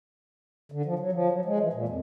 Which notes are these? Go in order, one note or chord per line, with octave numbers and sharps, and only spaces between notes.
D3
F3
F#3
F3
F#3
G#3
E3
A#2
F2